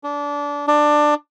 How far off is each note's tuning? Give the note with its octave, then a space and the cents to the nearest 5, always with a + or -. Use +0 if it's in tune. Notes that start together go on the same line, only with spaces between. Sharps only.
D4 -25
D4 +15